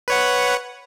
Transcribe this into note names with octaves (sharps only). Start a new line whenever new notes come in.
B4 C#5 F#5